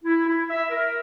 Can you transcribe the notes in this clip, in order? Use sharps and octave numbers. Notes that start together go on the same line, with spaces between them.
E4
E4
E5
A#4